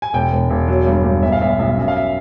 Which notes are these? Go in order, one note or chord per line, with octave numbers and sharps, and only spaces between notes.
G#5
E1 G5
E1
E1
F#3
G2
G2
B1 E5
F5
B1 E5
F5
B1 E5
F5
F#2 E5
F5
E5